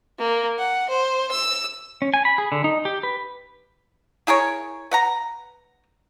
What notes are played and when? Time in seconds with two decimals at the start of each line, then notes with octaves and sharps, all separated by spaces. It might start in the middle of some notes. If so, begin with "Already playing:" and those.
0.19 A#3
0.58 F#5
0.89 C5
1.31 E6
2.02 C#4
2.14 G#5
2.25 B5
2.38 G#4
2.52 D3
2.64 D#4
2.85 G4
3.03 B4
4.27 E4 G#4 A#4 C#5
4.91 B4 F#5 A#5